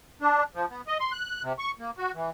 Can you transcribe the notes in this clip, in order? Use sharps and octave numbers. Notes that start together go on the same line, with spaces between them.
D4
F3
B3
D#5
C6
F#6
C3
C#6
A#3
F#4
E3